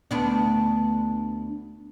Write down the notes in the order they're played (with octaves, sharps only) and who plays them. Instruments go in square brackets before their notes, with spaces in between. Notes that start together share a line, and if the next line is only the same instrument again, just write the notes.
[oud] D2 B3 D4